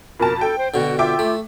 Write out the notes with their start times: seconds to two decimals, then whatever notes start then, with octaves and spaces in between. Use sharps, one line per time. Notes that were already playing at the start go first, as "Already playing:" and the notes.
0.20 F2 B2 A#4 A5
0.41 A4 G5
0.58 C5
0.74 B2 D3 F#4
0.99 F4 E5 G5 D6
1.19 A3